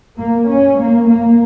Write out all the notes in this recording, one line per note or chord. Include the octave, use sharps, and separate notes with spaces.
A#3
C#4
A#3
A#3